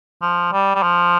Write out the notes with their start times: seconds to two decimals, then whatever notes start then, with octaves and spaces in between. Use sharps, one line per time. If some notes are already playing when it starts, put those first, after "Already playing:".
0.22 F3
0.52 G3
0.75 G3
0.83 F3